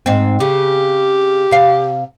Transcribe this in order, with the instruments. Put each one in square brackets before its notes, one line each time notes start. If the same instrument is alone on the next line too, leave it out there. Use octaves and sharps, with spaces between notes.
[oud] G#2 C4
[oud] C#3 [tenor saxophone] G4
[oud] C3 F5